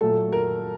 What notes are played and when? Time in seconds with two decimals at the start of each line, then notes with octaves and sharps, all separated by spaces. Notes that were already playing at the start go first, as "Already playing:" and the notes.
0.01 A#2 F#3 A3 A4
0.32 A#4